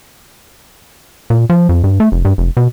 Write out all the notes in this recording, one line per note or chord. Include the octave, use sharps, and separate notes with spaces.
A#2
F3
F2
G2
A3
F1
G2
F1
B2